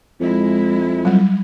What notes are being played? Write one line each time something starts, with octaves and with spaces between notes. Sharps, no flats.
F2 G#3 E4
F#3 G3